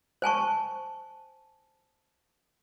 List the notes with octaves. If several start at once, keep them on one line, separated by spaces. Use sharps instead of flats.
C5 G#5 A5 C#6